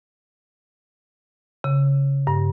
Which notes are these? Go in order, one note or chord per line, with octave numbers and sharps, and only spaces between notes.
C#3
G2